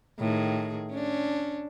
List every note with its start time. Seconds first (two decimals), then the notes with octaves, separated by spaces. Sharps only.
0.19 A2 D#3 G#4
0.91 C#4 D4